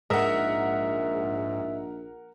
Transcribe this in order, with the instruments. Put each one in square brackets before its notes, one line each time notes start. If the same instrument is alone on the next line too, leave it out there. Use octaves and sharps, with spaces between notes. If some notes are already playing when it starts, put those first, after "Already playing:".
[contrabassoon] A#1 [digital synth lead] G#2 [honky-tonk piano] A#4 F#5 [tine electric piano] D#5 E5